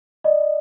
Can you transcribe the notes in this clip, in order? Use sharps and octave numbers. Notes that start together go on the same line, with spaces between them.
D5 D#5